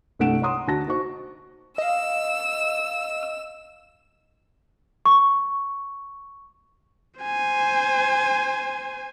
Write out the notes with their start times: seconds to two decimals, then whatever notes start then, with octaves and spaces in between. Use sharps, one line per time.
0.19 C2 G2 A3 F#5 D7 E7
0.42 C#5 F#5 A#5 C6 D#6
0.67 D2 F#4 A5 A#6
0.87 D#4 F#4 C5 C#6
1.78 D#5 F5 E6
5.06 C#6
7.20 C5 G#5